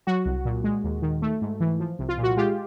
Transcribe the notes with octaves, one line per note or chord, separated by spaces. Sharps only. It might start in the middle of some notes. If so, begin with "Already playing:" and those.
F#3 F#4
C2
A#2
G#3
D#2
D#3
A3
G#2
E3
F3
C2
F4
A#2
F#4
G#3 F4 G4